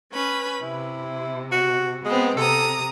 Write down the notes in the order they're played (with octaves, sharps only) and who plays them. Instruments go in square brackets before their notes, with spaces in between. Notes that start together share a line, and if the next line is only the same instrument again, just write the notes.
[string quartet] C#4 B4 B5
[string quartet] C3 [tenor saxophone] E4
[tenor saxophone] F#4
[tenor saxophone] G#3 [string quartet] B3 C4
[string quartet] C3 A#5 D#6 [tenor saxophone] A4